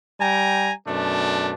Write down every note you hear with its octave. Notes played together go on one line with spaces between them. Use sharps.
G3 G5 G#5 A#5
F#2 B2 A3 D4